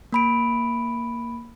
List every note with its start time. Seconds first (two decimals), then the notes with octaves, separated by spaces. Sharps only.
0.12 A#3 B5 D7